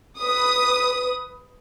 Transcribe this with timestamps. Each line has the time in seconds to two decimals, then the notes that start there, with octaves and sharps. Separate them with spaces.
0.19 B4 D#6